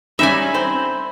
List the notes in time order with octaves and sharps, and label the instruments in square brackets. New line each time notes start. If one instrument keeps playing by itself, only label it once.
[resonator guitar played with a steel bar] G3 C#4 D#4 [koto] E5 G#5 [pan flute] B5
[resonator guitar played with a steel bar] C4 C5